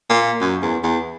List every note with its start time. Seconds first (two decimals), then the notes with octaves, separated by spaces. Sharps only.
0.10 A#2
0.41 F#2
0.62 E2
0.83 E2